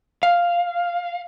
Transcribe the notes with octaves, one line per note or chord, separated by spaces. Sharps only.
F5